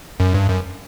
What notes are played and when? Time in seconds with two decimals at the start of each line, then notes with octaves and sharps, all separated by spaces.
0.20 F#2
0.34 G2
0.48 F#2